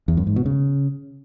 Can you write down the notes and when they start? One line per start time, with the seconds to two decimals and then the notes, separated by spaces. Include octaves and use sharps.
0.08 E2
0.17 F#2
0.27 G#2
0.36 B2
0.46 C#3